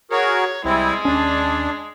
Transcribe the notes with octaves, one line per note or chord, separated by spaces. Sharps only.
F#4 G#4 A#4 C#5
C2 G3 G#3 C4 E4
D#2 C#4 D4